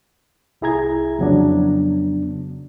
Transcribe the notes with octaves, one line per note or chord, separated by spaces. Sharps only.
C2 E4 G#4 A#5 G#6
F2 C#3 F#3 B3 D4